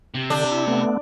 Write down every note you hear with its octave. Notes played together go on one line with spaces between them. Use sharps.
C3
D3 D4
E4
A3 B3